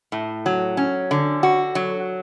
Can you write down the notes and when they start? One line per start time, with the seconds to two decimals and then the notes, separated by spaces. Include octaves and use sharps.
0.12 A2
0.46 F#3
0.77 C#4
1.11 D3
1.43 F#4
1.75 F#3